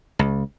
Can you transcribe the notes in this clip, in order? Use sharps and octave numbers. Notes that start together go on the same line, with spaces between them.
C#2